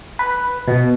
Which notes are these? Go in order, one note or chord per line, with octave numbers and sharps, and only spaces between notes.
B4
B2